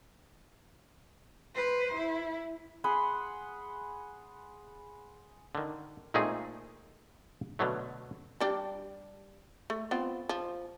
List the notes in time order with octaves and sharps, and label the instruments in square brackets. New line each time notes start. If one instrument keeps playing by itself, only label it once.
[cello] B4 C5
E4
[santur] G#4 F#5 B5 C6
[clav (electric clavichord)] D3 D#3
A#2 G#3 A3 C4 D#4 G#4
B2 D3 F#3 A3
[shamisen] G3 D4 G4
A3
B3 C4 F4
F3